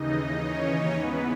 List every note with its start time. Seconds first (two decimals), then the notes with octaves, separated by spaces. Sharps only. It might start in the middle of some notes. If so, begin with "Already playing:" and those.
Already playing: D#2 C#3 E3 D#4 D#5
0.43 C#4 C#5
0.94 G#2 E3 B3 B4